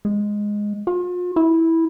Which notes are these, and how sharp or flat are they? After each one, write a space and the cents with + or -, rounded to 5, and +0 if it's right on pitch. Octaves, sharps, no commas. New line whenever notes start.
G#3 -5
F4 +40
E4 -10